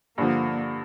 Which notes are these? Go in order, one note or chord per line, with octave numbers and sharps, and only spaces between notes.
G2 D3 F3 A#3